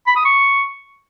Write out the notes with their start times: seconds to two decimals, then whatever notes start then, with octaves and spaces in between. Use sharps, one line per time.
0.07 B5
0.16 D#6
0.25 C#6